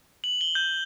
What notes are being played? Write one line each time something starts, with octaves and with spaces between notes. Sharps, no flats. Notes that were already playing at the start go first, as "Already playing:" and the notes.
F#7
G7
G6